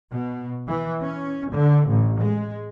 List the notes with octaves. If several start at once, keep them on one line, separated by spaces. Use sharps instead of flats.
B2
E3
C#4
D3
A1
G#3